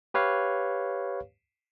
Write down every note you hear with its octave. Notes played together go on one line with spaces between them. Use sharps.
G4 B4 C#5 F5